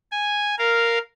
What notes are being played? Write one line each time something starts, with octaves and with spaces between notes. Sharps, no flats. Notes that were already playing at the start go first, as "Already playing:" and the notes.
G#5
A#4 F5